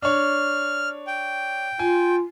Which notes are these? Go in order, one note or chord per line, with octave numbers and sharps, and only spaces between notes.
D4 C#5 F6
G5
F4 G#5